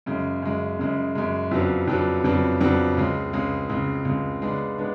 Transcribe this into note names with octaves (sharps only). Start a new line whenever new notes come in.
F#2 C#3 G#3
F#2 C#3 G#3
F#2 C#3 G#3
F#2 C#3 G#3
F2 C#3 F#3 B3 D4
F2 C#3 F#3 B3 D4
F2 C#3 F#3 B3 D4
F2 C#3 F#3 B3 D4
C#2 C#3 G#3
C#2 C#3 G#3
C#2 C#3 G#3
C#2 C#3 G#3
C#3 G#3 B3 D4
G#3 B3 D4